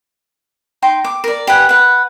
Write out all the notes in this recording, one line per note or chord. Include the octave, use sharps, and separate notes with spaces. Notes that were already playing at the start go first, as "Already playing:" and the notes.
D#4 G5 C6
D6
A#4 D5
G4 B4 F#5 G#5
B4 F#5